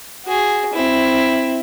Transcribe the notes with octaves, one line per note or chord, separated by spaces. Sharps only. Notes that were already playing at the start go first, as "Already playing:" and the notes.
F#4 G#4
C4 E4